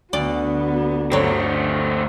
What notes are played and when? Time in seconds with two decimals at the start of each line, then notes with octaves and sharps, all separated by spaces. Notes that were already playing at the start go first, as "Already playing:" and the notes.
0.13 D2 B3 F#4 D5
1.12 G1 D3 F#3 A3 C4